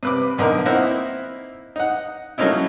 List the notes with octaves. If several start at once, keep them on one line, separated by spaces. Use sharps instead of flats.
C3 B4 D6
B1 D3 D#4 A#4
A#3 C4 D#4 E4 F#5
D#4 F#5
F#3 A3 A#3 C#4 D#4 E4